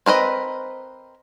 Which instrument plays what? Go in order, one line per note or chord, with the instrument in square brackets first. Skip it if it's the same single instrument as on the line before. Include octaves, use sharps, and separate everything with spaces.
[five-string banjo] C4 A#4 B4 D#5